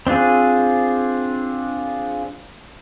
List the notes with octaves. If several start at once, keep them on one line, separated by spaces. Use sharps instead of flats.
C4 D4 F4 G#4